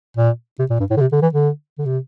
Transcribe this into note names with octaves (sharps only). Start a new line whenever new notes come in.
A#2
C3
A#2
G2
A2
D3
C3
D3
E3
D3
D3
C3